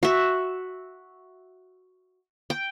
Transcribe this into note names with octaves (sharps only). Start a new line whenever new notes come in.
F#4 E5
G5